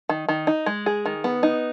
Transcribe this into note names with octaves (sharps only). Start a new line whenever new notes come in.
D#3
D#3
D#4
G#3
G#4
D#3
B3
D#4